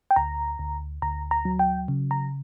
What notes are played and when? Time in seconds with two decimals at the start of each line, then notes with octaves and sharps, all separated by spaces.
0.11 G5
0.16 D2 A#5
0.59 D2
1.02 D2 A#5
1.31 A#5
1.45 F#3
1.59 G5
1.88 C#3
2.11 A#5